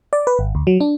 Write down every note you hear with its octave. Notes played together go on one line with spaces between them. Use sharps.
D5
B4
G#1
D2
F#3
D4